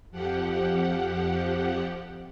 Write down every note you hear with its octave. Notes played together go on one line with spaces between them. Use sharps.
F2 F3 G4 F#5